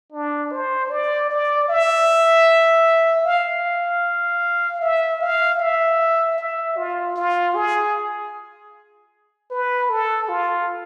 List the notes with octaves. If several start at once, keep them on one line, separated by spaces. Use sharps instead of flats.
D4
C5
D5
D5
E5
F5
E5
F5
E5
E5
F4
F4
G#4
B4
A4
F4